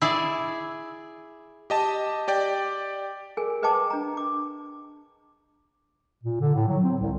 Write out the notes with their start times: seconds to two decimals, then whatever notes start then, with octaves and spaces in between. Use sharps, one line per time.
0.02 E4 G#4 D5
1.70 G4 D#5 A5
2.28 G4 D5 G5
3.37 G#4 A#4 G#5
3.62 G#4 B4 D#5 G5 A5 D6
3.90 D4 A#5
4.17 D6
6.23 A#2
6.40 D3
6.55 A2
6.68 F#3
6.83 C4
7.02 C2